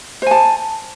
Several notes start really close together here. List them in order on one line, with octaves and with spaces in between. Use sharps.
C5 G#5 A5